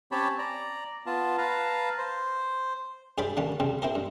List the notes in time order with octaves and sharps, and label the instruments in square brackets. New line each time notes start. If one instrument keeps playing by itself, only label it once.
[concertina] C4 C#4 G4 C#5 A5 B5
D5 A#5
B3 F4 A5
B4 F5 A5 A#5
C5
[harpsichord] G2 G#4 C5 D5 G5 B5
D3 G3 A#3 C#4
C#3 G3 C4
C4 E4 G4 A#4
G2